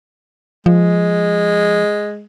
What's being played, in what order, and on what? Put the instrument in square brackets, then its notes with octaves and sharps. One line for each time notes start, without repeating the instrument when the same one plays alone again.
[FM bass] F3 [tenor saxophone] G#3